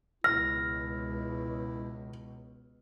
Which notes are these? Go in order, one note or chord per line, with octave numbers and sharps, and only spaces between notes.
C#2 B2 E4 F6 A#6